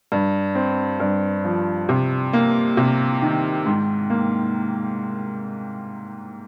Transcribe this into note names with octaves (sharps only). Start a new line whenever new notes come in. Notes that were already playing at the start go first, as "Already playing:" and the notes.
G2
C4
G2
F3
C3
A#3
C3
D#3
G#2
A#3